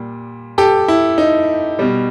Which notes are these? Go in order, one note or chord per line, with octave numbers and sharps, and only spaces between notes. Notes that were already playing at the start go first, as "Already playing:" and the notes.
Already playing: A#2 G3
G4 A4
E4
D#4
B2 G3